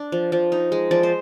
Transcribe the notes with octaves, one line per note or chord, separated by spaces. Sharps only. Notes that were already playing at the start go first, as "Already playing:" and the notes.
Already playing: D4
F3
F3
D#4
G#3
F3 D5
C5